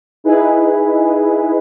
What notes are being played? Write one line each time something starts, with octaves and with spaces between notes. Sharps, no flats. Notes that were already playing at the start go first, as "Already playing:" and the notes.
D#4 E4 G#4 B4